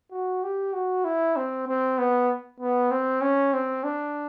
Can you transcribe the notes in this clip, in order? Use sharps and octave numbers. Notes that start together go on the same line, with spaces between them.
F#4
G4
F#4
E4
C4
C4
B3
B3
C4
C#4
C4
D4